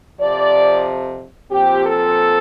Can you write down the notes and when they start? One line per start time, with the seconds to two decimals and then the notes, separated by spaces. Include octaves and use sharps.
0.20 F2 C3 F3 D5
1.51 A#2 F3 C4 G4
1.84 A4